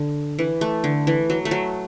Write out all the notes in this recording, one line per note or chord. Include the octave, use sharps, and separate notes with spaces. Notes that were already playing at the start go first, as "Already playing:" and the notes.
Already playing: D3
E3
A3
D3
E3
F#3
A3
F#3